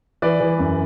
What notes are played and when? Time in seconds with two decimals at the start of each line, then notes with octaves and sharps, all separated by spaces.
0.22 E3 B4 D5
0.40 E3
0.59 F#2